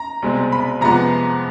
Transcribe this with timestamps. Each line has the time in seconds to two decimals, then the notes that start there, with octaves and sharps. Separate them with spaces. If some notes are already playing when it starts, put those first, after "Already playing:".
Already playing: A#5
0.22 C2 B2 G#3 C4
0.52 B5
0.81 F2 C3 F3 G#3 B3 A#5